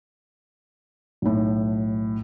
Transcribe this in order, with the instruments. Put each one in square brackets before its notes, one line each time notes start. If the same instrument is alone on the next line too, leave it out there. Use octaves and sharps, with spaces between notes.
[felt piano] B1 A2